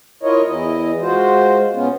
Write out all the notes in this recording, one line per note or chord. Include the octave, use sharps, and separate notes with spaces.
E4 F4 A#4 C#5 D#5
E2 E3 E4 D#5
G#3 F4 F#4 C5
B2 B3 C#4 F4